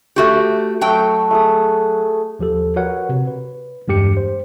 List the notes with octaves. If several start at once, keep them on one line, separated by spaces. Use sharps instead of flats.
A3 F#4 G4
F#3 A3 G5
A3 G#4 D#6
D#2 F3 G4 A4
F#4 A#4 B4 C#5 F#5
C3
B4
E2 G2 G#3 G4 C#7
C5